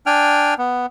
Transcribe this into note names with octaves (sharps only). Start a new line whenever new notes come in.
D4 G5 G#5 F6
B3